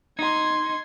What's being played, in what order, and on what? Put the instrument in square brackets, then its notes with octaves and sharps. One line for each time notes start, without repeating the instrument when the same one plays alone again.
[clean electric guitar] D#4 [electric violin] C6 G#6